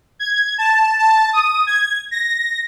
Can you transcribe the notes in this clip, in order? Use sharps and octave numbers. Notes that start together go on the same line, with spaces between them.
G#6
A5
A5
D#6
G#6
A#6